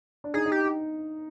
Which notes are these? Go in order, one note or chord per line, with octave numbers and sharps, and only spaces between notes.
D4
D#4 G#4
D#4
G4